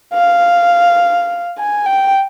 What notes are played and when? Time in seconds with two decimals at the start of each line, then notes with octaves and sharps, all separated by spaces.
0.14 F5
1.58 G#5
1.86 G5